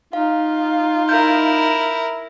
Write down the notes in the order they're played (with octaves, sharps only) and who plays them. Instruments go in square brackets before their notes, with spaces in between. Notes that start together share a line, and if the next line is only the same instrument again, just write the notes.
[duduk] D#4 [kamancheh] F4 [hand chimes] F5
[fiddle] E4 A#4 [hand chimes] G6